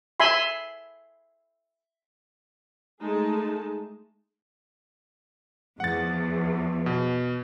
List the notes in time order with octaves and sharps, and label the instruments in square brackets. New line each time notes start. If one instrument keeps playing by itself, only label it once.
[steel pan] E5 G#5 B5 C6
[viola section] G#3 A3 D#4 G#4 A5
[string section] E2 F3 [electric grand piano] F#5 A6
[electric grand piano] B2